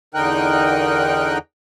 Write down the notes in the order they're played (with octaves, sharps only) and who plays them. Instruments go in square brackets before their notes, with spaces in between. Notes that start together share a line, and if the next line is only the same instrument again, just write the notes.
[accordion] E2 D3 D#4 A#4 G5 F#6